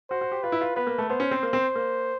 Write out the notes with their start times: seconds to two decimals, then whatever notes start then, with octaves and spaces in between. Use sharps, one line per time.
0.10 F#4 C5
0.21 F#4
0.32 G4
0.43 F4 B4
0.52 E4
0.61 F4
0.76 B3 B4
0.87 A#3
0.98 A3
1.10 B3 C5
1.20 C#4
1.31 C4
1.43 A#3
1.53 C4
1.75 A#3